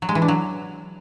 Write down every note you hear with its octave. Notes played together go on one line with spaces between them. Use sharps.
F#3
G#3
E3
D4
F#3